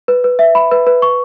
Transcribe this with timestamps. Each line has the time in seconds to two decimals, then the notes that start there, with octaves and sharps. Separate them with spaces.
0.08 B4
0.24 B4
0.39 E5
0.55 B5
0.71 B4
0.87 B4
1.02 C#6